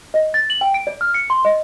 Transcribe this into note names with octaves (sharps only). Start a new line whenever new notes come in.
D#5
A6
F#7
G5
D7
D5
F6
C#7
C6
D#5